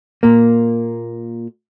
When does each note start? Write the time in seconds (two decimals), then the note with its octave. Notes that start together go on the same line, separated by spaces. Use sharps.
0.23 A#2 A#3